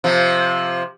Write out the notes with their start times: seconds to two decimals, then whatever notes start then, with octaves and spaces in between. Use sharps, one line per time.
0.04 C3 F3